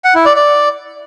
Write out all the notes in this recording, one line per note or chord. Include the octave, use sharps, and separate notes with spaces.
F#5
E4
D5
D5